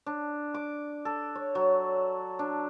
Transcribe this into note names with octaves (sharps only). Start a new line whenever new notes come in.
D4
D6
A4
C#5
F#3
D4